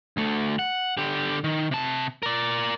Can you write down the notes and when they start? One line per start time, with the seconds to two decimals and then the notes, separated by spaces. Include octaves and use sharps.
0.17 D2 A3
0.59 F#5
0.97 D3 G4
1.44 D#3
1.71 C3 A5
2.23 A#4 D5